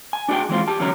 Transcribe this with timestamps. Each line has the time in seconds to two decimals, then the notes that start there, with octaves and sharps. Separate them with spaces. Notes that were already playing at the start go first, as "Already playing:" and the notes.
0.13 G#5
0.29 D4 F#4 G#4 E5 G5
0.49 E3 G#3 C4 F4
0.68 G4 A5
0.79 E2 D3 F#3 C#4 A#5